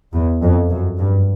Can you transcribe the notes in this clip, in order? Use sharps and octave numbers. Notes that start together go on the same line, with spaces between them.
E2
F2
F#2
G2